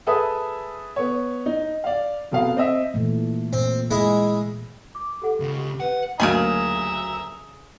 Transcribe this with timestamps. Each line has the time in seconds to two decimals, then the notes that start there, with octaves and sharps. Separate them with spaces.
0.07 G#4 A4 B4 E5 D#6
0.96 B3 C#5
1.46 D#4
1.84 D5 F5
2.31 F1 B2 F5
2.57 C4 D#5 E5
2.94 A#2 E3 A3
3.53 A#2 C4
3.91 G#3 E4
4.95 D6
5.22 G4 A4 F#5
5.40 C#2 C#3
5.57 G4
5.80 B4 F#5
6.20 D2 C#3 F#3 G3 A#3 G#4 E5 A#5